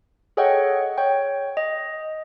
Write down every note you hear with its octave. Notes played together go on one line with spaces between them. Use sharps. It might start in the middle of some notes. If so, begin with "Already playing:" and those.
G#4 A4 C#5 D#5 F#5 G5
C#5 G5
D#5